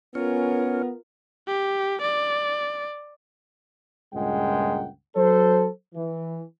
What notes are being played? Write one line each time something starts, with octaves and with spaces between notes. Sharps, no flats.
B3 C#4 F4 A#4
G4
D5
C#2 G2 A#2 G#3 F#5 G5
F#3 A4 C5
E3